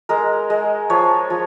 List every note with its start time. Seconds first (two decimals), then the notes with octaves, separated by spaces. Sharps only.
0.09 G#3 A#4
0.50 G#3
0.90 F3 C#5
1.30 F3